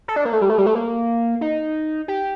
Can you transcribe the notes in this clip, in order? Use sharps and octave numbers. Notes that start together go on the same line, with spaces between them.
A4
D4
A#3
A3
G3
A3
G3
A3
A#3
D#4
G4